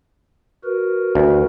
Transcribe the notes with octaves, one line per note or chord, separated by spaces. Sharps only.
F#4 A#4 B4
D2